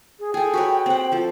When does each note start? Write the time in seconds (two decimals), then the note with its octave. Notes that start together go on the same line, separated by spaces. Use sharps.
0.20 G#4
0.34 G#4 A4 G5
0.54 F#4 B4 C#5
0.86 C4 F#5
1.12 F3 A4